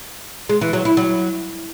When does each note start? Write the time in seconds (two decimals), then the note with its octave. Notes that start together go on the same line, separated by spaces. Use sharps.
0.49 G#3
0.61 E3
0.73 F#3
0.85 E4
0.97 F#3